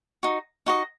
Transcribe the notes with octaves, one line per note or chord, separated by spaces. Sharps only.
D#4 F#4
D#4 F#4 D#5